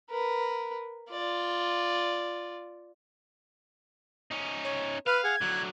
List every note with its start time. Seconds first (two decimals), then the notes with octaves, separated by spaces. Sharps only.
0.10 A#4 B4
1.10 F4 D5
4.31 C#4 D#4
4.65 C#5
5.07 B4 F5 F6
5.24 G#4 F#5 G#6
5.41 D3 F#3 F#6